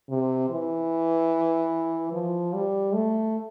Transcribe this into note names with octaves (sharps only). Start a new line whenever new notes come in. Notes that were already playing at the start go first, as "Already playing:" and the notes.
C3
E3
F3
G3
A3